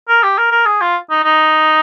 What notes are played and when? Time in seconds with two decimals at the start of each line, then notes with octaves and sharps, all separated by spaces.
0.09 A#4
0.23 G4
0.38 A#4
0.51 A#4
0.66 G#4
0.81 F4
1.10 D#4
1.24 D#4